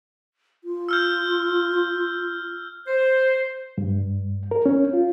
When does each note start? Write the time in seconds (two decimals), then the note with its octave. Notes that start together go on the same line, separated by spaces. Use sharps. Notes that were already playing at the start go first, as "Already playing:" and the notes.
0.64 F4
0.89 E6 F6 G6
2.87 C5
3.78 G2
4.51 A#4
4.66 C#4
4.93 F4